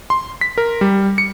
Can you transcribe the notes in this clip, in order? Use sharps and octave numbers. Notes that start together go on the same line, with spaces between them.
C6
B6
A#4
G3
C#7